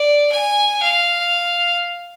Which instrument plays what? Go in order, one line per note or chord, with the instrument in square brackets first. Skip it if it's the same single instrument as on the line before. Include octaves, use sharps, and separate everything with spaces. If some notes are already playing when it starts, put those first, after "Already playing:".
Already playing: [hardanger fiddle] D5
G#5
F5